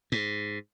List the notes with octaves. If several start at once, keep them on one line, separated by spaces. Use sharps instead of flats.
G#2